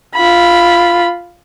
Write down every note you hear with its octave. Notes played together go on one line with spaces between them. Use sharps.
F4 B5